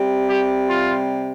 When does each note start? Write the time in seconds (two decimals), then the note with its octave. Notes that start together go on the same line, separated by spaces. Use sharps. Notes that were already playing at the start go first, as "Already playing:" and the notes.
Already playing: C3 G3
0.28 G4
0.67 F4